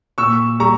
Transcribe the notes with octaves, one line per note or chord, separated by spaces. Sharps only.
A#2 C#6 E6
G3 A#5 C#6